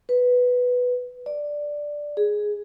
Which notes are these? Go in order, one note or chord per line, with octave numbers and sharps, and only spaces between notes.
B4
D5
G#4